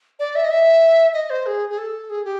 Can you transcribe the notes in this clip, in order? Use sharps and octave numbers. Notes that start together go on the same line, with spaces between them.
D5
E5
D#5
E5
D#5
C5
G#4
G#4
A4
G#4
G4